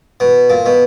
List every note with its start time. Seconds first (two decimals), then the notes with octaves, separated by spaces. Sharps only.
0.20 B2
0.50 A#2
0.66 B2